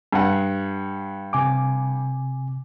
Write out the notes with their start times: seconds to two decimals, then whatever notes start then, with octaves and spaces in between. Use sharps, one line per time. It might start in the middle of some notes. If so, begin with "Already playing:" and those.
0.13 G2 F#5
1.33 C3 G#5 D6